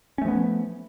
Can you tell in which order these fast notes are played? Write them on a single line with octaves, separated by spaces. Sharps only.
C#4 A3 F3 B3